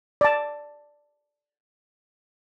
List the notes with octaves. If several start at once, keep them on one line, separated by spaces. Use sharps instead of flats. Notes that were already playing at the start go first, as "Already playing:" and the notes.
D5 A5